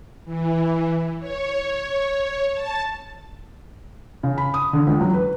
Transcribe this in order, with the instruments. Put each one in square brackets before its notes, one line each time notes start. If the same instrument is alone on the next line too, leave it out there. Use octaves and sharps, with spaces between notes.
[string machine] E3
C#5
A5
[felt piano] C#3
B5
D#6
D3
C#2
F#3
B4